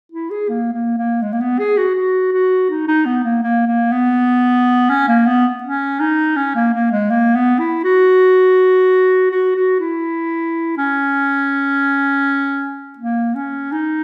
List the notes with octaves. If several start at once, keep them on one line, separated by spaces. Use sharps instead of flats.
E4
G#4
A#3
A#3
A#3
G#3
A#3
B3
G#4
F#4
F#4
F#4
D#4
D#4
B3
A#3
A#3
A#3
B3
C#4
A#3
B3
C#4
D#4
C#4
A#3
A#3
G#3
A#3
B3
E4
F#4
F#4
F#4
E4
C#4
A#3
C#4
D#4